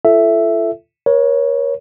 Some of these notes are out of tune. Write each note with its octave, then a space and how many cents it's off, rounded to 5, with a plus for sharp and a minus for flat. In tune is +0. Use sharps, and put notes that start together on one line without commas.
F4 -40 A4 +0 E5 +5
A#4 +40 C#5 +0